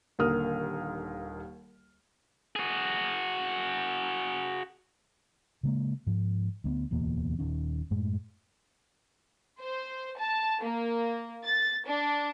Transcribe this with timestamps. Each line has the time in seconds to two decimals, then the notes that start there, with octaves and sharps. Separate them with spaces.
0.19 D#1 D#2 D3 A#4 D#6 F6
2.56 F#4 G#4
5.63 C#3 G#3 A#3
6.07 G#2 F3
6.64 D2 A#3 B3
6.91 D1 E2 B2 A#3
7.39 D#1 G#1 D#3 C#4
7.91 F#2 A2 G#3
9.60 C5
10.18 A5
10.63 A#3
11.45 A6
11.87 D4